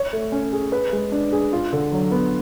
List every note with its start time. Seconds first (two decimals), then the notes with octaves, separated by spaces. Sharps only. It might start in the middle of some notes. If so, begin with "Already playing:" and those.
Already playing: C#5
0.13 A3
0.32 C#4
0.53 G#4
0.72 B4
0.93 G#3
1.12 D4
1.33 G#4
1.53 F4
1.73 D3
1.92 F#3
2.12 B3